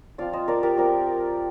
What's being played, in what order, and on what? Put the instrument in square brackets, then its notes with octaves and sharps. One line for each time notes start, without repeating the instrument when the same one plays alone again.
[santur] F3 C4 F4 D5 F5
C5 D#5
A#4 D5
G4 A#4
F3 C4 F4 A#4 D5